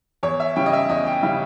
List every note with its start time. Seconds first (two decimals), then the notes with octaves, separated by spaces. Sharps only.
0.23 E2 C#5
0.40 E5
0.56 C#3 G3 C#4 E4 G5
0.66 D#5
0.73 E5
0.89 E2 D#5
1.07 G5
1.23 C#3 G3 C#4 E4 E5